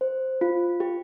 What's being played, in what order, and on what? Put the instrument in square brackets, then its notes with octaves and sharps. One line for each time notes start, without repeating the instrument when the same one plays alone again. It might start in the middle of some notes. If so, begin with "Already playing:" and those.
[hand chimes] C5
F4
G4